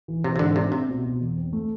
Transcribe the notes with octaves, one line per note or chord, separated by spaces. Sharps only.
E3
C3 E3
C3
G#2 D3
C3 D4
C3 C4
B2
B2
E2
C4
A3